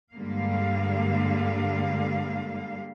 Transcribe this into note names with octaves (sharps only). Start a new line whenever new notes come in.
G2 D3 G3 G#3 A#3 F5